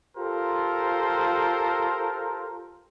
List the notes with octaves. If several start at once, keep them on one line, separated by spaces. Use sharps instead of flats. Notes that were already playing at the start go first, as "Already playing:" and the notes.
F4 G4 A4 A#4 C5